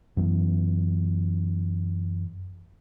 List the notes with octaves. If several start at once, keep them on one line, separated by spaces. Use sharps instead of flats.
F#2 E3 B3